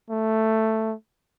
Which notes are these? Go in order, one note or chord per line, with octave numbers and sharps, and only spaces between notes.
A3